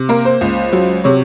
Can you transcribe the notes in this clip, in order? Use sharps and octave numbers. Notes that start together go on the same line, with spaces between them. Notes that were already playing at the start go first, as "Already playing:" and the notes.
Already playing: C3
A#3 A#4
C5
C#2
F#3
C3 C#5